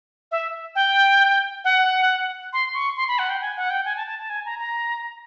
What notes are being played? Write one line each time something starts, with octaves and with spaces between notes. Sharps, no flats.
E5
G5
F#5
C6
C#6
C6
B5
F#5
G5
G#5
F#5
G5
G#5
A5
A5
A5
G#5
A#5
A#5